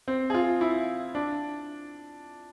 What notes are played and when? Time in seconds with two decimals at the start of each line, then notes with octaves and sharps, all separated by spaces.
0.08 C4
0.30 G#4
0.34 F4
0.61 E4
1.15 D4